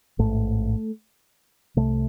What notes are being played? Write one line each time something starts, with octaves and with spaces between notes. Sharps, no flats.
A1 G#2 A3
C2 C3 A3